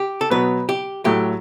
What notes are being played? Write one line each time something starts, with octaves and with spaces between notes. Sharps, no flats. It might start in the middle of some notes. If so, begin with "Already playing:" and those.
Already playing: G4
A4
B2 F#3 B3 B4
G4
A2 F#3 A3 G4